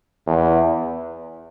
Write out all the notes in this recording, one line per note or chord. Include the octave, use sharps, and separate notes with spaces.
E2